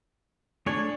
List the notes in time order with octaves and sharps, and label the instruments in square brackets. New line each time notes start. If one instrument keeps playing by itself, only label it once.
[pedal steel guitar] A3 C#5 G#5 [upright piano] D4